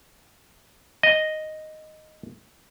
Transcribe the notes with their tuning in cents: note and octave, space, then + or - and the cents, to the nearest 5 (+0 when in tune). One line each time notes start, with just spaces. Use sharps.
D#5 -5